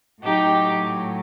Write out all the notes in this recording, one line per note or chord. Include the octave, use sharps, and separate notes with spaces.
A2 F#3 D#4 G4